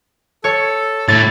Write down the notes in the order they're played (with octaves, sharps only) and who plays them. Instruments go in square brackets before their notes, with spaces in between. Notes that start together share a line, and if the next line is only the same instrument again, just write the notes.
[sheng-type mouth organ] A4 [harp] C#5
[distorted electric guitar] A2 [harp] A6